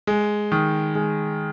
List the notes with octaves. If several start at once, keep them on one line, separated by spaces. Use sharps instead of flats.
G#3
D#3
G#3